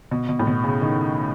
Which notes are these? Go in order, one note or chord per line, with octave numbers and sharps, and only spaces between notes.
B2
B2
A2
B2
C#3
D#3